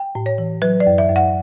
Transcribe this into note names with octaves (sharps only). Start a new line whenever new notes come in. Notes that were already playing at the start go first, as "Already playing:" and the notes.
Already playing: G5
A2
C#5
E3
F#3 B4
D5
F#2
E5
F#2
F#5